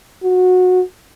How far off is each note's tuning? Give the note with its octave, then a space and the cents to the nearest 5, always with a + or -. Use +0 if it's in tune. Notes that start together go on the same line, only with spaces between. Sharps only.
F#4 -20